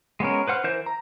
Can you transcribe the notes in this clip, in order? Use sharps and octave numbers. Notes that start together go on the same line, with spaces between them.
G#3 B3 C#4 A#4
B4 C5 F#5 F6
E3 A#4 C5 G6
A#5